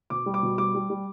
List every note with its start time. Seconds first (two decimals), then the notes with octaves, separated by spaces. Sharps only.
0.10 B2 D6
0.26 G3
0.34 D6
0.43 B2
0.58 G3 D6
0.75 G3
0.90 G3